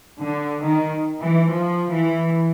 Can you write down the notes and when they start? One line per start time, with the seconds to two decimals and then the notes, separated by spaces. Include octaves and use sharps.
0.21 D3
0.64 D#3
1.21 E3
1.49 F3
1.92 E3